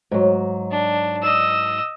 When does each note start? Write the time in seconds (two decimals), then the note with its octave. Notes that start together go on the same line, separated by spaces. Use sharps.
0.11 G#2 F#3
0.71 D4
1.23 D#5 E6